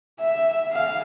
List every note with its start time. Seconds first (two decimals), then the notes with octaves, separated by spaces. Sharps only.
0.19 E5
0.72 F5